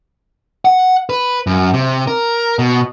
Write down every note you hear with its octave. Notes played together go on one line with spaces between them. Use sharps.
F#5
B4
F#2
C3
A#4
B2